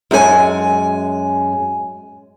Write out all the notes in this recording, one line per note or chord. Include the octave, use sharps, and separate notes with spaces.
F#2 G#3 G#4 G#5